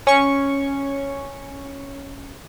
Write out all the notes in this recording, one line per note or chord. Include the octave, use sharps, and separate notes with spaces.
C#4 C#6